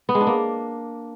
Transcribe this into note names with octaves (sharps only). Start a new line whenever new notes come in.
B3
G#3
D4
A#3